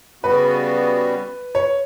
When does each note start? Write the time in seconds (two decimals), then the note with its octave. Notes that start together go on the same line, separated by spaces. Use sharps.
0.23 C#3 G3 B3 F#4 B4
1.55 C#5